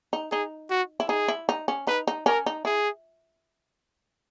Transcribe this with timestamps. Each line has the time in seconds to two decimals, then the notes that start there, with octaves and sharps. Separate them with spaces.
0.13 D#4
0.32 D#4 G#4
0.70 F#4
1.00 E4
1.09 D#4 G#4
1.28 E4
1.49 D#4
1.68 C#4
1.87 D#4 B4
2.08 D#4
2.26 C#4 A#4
2.46 D#4
2.65 E4 G#4